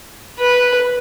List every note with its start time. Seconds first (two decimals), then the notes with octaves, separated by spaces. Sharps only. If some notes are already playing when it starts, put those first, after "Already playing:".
0.39 B4